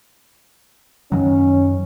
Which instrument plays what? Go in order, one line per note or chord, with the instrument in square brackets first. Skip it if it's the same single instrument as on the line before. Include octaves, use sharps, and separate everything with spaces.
[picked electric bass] F#2 D#3 F#3 [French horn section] C#4